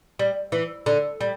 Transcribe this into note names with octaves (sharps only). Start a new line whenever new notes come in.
G3
E3
D3
G3